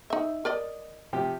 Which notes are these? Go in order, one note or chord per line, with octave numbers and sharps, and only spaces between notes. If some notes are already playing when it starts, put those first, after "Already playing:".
D#4 E5
A#4 D5 D#5
C3 F3 G4